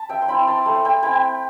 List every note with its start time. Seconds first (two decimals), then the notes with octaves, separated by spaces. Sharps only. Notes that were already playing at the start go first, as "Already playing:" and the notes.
Already playing: A5 B5
0.09 E5 G5
0.22 C6
0.28 C4 E4 G5 B5
0.47 A5 C6
0.66 A3 B5
0.75 C6
0.85 G5 B5
1.03 C4 E4 G5 B5